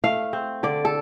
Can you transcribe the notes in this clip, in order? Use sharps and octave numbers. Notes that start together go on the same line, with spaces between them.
A3 F5
C4
D3 D5
A4